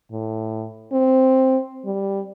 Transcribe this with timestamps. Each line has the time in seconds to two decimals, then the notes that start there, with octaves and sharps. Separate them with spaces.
0.12 A2
0.92 C4
1.85 G3